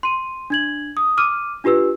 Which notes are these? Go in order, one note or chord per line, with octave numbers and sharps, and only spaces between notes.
C6 D#7
D4 G#6 F#7
D#6
D6 F6 D#7
D4 F4 G4 B4 E6